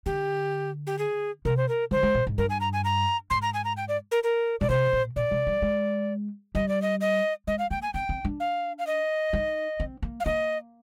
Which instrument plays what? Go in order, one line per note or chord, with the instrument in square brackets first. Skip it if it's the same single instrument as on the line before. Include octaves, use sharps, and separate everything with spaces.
[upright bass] D3 [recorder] G4
[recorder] G4
G#4
[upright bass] C3 [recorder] A#4
[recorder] C5
A#4
[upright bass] D3 [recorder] C5
[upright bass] G#3
A#2
G#2
[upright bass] G2 [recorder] A#4
[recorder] G#5
A#5
G#5
A#5
[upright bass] G#2 [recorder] C6
[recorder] A#5
G#5
A#5
G5
D5
A#4
A#4
[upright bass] A#2 [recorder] D5
[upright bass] C3 [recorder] C5
[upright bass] A#2
[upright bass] A#2 [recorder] D5
[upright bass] C3
G3
G#3
[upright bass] G3 [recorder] D#5
[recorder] D5
D#5
D#5
[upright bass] G#3 [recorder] D#5
[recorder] F5
[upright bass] A#3 [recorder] G5
[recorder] G#5
[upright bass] C4 [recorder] G5
[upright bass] C4
D4
[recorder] F5
F5
D#5
[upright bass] D#4
C4
A#3
[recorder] F5
[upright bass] A#3 [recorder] D#5